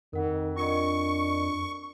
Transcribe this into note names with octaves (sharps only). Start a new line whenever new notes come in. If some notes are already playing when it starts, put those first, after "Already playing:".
F2 D#3 A#4 F#5
D4 F4 A#4 D#5 C#6